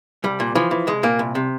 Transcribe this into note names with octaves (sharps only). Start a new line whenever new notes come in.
C2 G3
A#2
E3 F3
E3
C2 G#3
A#2 A#3
C2
C3